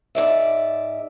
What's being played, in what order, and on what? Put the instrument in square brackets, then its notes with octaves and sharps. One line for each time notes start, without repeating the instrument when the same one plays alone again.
[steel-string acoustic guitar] G#2 D5 E5